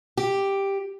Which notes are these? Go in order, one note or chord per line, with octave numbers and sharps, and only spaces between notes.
G4